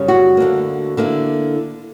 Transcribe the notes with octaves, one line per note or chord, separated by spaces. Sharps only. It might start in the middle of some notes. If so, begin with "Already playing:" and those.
Already playing: F#2 C#3 G3 C#4
F#4
D2 D3 A#3
D3 A#3 E4